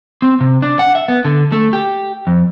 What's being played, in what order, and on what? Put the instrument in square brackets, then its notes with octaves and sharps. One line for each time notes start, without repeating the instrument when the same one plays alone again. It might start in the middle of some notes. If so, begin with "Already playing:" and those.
[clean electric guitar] C4
C3
D4
F#5
E5
B3
D3
A3
G4
F2